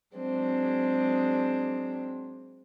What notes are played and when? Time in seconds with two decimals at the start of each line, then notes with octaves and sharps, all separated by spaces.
0.15 F#3 G#3 C4 D4